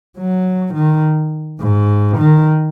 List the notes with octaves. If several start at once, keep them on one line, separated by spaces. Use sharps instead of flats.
F#3
D#3
G#2
D#3